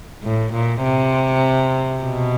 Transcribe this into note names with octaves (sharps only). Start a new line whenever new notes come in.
A2
A#2
C3
B2